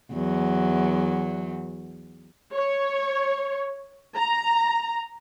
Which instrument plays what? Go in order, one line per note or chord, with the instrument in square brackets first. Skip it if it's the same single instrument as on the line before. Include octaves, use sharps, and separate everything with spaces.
[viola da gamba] E2 F#3
[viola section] C#5
A#5